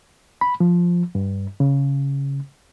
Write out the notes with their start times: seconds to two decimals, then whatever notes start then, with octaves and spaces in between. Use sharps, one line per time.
0.41 B5
0.60 F3
1.15 G2
1.60 C#3